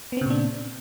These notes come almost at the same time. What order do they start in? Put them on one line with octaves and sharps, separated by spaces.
B3 C4 C#3 A#2 D4